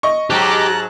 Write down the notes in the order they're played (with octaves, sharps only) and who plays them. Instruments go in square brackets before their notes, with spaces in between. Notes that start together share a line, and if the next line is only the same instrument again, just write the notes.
[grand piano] D#5 C#6
[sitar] G#2 F#3 [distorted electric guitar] G4 G5 [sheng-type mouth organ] A5 A#5 F#6